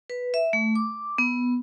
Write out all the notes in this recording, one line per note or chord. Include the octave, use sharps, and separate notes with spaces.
B4
E5
A3
D6
B3